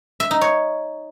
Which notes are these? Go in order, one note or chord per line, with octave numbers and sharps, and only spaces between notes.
E5
D#4
C#5